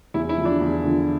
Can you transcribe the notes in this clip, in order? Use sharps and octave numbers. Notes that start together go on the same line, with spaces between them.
E2 E4
E4
D3 F3
D4
E2
D3 F3